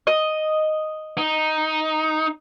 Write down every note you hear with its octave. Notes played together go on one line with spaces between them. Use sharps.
D#5
D#4